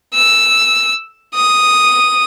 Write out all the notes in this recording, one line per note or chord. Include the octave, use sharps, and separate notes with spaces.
E6
D#6